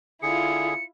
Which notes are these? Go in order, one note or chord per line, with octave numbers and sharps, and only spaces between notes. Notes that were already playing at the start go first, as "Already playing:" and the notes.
D3 E4 F4 G#4 C#7